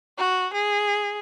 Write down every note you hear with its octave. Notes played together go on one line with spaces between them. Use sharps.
F#4
G#4